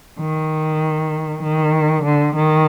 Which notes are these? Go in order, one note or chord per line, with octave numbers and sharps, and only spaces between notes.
D#3
D#3
D3
D#3